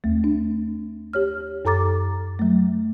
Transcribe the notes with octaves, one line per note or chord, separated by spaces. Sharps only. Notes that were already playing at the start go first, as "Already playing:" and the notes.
D#2 A3
D4
G4 C#5 F6
F#2 A4 A#5 D6 A6
F#3 A3